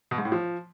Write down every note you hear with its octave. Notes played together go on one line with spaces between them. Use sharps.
B2
G#2
A2
F3